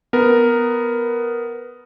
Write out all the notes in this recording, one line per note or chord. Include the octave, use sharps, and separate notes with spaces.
B3 A#4